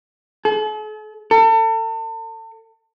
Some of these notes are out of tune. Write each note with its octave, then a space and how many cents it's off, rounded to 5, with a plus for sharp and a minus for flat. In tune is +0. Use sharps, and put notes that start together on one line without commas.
A4 -45
A4 +40